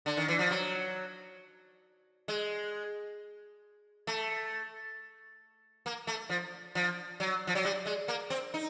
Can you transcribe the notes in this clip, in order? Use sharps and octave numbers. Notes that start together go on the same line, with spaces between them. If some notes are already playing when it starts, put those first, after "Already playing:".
D3
D#3
E3
F3
F#3
G#3
A3
A#3
A3
F3
F3
F#3
F3
F#3
G3
G#3
A#3
C4
D#4